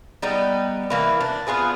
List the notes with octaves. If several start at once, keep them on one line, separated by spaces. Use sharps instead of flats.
G3 B3 D#4
E3 A#3 B4
D4
B3 F4 G#4 B4